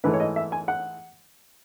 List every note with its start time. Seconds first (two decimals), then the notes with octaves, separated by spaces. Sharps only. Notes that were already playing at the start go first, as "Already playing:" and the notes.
0.04 G#2 E3 A3 B4
0.13 C#5
0.20 D#5
0.36 E5
0.52 G#5
0.68 F#5